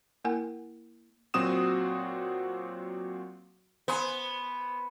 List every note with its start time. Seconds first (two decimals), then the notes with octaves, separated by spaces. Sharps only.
0.24 A#3 E4 A#4 F#5 G#5
1.34 A#2 F#3 C4 F#4 D#6 E7
3.88 B3 C5 G#5 C6